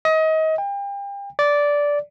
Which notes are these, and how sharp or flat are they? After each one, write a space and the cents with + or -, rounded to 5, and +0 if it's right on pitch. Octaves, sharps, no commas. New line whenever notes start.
D#5 +30
G5 +35
D5 -10